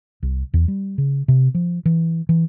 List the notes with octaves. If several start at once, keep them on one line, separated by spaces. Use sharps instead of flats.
C2
E2
G3
C#3
C3
F3
E3
E3